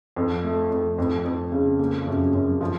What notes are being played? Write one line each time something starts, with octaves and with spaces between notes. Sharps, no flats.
F2
A3
F2
F2
F2
C#3
A#3
F#2
F#2
F3